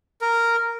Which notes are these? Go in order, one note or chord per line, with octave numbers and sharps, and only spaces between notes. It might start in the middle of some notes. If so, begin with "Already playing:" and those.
A#4